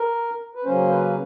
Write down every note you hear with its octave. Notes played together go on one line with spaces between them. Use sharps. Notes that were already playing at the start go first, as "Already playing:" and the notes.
Already playing: A#4
B4
C#3 F#3 A#3 C#4 C5
B4